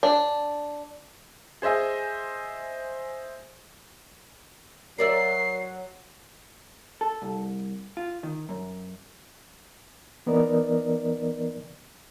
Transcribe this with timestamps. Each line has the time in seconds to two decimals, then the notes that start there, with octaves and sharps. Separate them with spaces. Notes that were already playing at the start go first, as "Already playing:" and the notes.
0.03 D4
1.62 G#4 C5 D#5 E5 G#5
4.98 F#3 A#4 D5 E5 C7
7.01 A4
7.22 C2
7.97 F4
8.23 D#3
8.49 F#2
10.26 E3 B3 D#4 A#4 D5 D#5